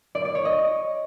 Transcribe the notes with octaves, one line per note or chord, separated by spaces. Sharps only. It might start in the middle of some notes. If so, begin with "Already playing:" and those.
D5
D5
C#5
D#5